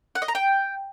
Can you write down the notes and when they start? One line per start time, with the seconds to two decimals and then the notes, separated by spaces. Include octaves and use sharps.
0.15 F#5
0.22 D#5
0.28 A#5
0.35 G5